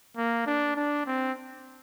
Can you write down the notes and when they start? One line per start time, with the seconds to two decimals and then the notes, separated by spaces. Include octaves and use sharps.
0.17 A#3
0.46 D4
0.76 D4
1.06 C4